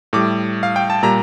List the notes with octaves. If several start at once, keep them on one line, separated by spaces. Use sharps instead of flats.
A2 G3 D6
F5
G5
A5
A#2 G3 A#5